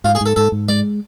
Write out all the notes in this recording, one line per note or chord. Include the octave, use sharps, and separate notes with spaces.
G#2 F4
G#4
G#2 A4
G#2 A4
G#2
G#3 D5